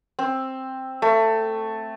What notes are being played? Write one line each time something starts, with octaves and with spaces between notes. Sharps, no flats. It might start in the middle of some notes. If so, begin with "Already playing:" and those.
C4
A3